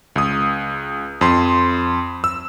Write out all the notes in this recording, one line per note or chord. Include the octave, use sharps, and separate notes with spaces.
C#2 D#6
F2 C6
E6